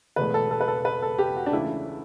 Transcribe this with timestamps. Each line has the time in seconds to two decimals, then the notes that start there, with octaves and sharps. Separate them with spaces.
0.16 E1 E2 B2 A3 B4
0.34 A4
0.51 A4
0.61 B4
0.68 A4
0.85 B4
1.02 A4
1.19 G4
1.36 F#4
1.46 D4
1.53 C#2 C#3 E3 A3 E4